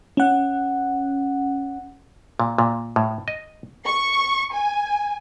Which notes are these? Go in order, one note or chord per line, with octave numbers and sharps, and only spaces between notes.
C#4 F#5
A#2
A#2
A2
D#5
C#6
G#5